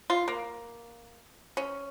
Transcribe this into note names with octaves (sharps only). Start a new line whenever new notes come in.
F4
A#3
C#4